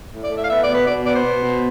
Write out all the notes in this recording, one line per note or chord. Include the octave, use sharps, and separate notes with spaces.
A2
D5
A3
E5
F5
B3 E5
D5
B2
B4
B2 D5
B3 D5
C5
B2
B2